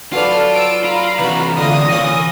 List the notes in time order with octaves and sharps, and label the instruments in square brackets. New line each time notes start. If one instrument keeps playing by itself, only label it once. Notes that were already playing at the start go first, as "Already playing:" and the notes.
[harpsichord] F#3 D5 [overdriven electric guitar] F4 [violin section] A4 B4 F6
[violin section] E6 D7
[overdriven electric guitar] F4 [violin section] F5 A#5 B5
[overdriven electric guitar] C3 E3 [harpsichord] F#4 B4
[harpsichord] D3 A3 F4 [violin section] D#6 A#6
[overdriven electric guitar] E3 [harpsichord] A#3 C#4 A#4